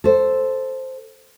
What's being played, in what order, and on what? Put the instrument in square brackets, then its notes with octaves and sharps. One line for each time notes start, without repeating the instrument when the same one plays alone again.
[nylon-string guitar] A4 C5